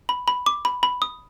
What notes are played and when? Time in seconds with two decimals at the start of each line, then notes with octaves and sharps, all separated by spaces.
0.09 B5
0.28 B5
0.46 D6
0.65 B5
0.83 B5
1.02 D#6